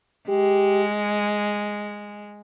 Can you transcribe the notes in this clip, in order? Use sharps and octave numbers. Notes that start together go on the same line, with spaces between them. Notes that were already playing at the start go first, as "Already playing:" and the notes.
G#3 G4